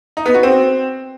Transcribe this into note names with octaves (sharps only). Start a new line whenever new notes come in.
D#4
B3
F#4
C4